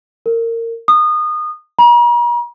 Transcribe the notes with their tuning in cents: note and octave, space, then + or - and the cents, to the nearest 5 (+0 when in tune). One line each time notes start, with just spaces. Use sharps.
A#4 -25
D#6 -25
A#5 +45